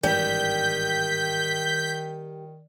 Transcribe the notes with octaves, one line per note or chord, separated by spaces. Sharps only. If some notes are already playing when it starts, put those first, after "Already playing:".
G#1 G2 D#3 E3 G3 G6 B6